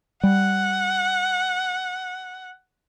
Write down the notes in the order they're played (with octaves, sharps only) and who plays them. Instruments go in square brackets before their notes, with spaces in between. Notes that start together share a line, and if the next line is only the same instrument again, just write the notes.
[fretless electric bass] G3 [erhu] F#5